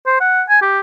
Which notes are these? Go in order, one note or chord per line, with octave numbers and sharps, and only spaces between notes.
C5
F#5
G#5
G4